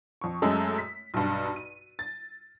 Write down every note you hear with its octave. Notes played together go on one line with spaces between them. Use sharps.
F2 C#6
F#2 G#3 A3 C#4
B6
B1 G2
D#7
A6